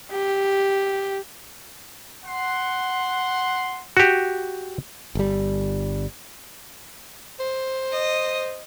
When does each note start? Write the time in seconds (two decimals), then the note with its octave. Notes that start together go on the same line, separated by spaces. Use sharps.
0.11 G4
2.25 F#5 C6
3.97 F#4 G4
5.15 G1 G3
7.40 C5
7.92 D#5